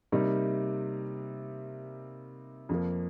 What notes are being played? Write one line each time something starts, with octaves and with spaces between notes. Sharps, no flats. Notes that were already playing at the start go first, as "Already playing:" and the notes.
C3 G3 A#3 D#4
F2 F3 A#3